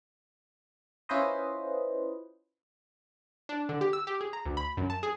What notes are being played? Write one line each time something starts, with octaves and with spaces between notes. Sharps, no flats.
C#4 E4 F4 B4 C5 D#5
D4
D3
G4
E6
G4
G#4
A#5
D2
B5
F#2
A5
G#4